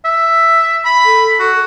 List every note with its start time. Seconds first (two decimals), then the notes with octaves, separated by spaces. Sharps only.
0.05 E5
0.85 B5
1.05 A4
1.39 F#4